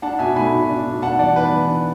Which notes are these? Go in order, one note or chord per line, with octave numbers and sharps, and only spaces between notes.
D4 F#5 A5
B2 E5 G#5
A3 G#5 B5
B2
D4
B2
D4 F#5 A5
E3 D5 F#5
B3 B4
E3
D4